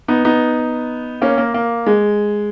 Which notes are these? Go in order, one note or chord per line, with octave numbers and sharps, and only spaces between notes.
B3 D#4
B3 D#4
A#3 C#4
A#3
A#3
G#3